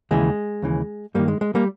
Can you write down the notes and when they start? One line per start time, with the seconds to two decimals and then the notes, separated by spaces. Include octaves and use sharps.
0.11 D#2 C#3 E3 G#3
0.62 D#2 C#3 E3
1.14 G2 D#3 G3 A#3
1.28 G#3
1.41 G#3
1.55 G3 A#3